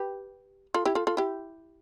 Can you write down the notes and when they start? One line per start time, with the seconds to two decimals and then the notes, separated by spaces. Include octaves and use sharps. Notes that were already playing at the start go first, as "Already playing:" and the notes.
Already playing: G4 B4
0.74 F4 A4
0.85 E4 G4
0.95 F4 A4
1.07 F4 A4
1.17 E4 G4